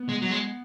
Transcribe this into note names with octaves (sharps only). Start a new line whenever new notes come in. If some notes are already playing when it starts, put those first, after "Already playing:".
Already playing: B3
G#3
F#3
G#3